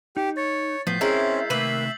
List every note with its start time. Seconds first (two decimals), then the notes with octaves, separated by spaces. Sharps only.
0.17 D#4 G4
0.37 C#5 A6
0.87 A2 F3 B3 G6 B6 C7
1.01 G#3 C4 C#4 E4 A#4 E5 E6 C7
1.50 C3 D#3 A3 A#3 B4 E5 F#7